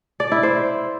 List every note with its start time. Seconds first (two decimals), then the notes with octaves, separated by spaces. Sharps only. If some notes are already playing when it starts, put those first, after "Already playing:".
0.20 D5
0.32 E4
0.43 C5